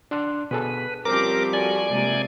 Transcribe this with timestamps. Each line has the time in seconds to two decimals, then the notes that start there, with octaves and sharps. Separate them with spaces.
0.11 D4 C6 F#6
0.51 B2 G#4 A4 B4
1.05 F3 G3 C4 C#4 G4 A#4 A#5 D6
1.53 F#4 A4 D5 G#5
1.89 C3 G#3 A#3